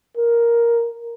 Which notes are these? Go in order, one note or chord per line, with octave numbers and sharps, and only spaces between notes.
A#4